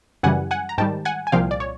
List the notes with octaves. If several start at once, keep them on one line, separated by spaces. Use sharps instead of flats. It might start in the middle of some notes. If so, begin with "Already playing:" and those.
F#2 C#3 E3 G3 F#5 G#5
F#5 G#5
A#5
G#2 D#3 G3 G5 A5
F#5 G#5
G#5
C2 A#2 F3 F5 G5
D5
C#5